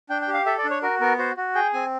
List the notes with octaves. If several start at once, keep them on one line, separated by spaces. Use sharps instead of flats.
D4 G5
G5
G4
F5
A4 E5
D5
D4
C#5
F#4 A#4
B3 A#4
F#4 C5
F#4
G#4 G5
C4 G#5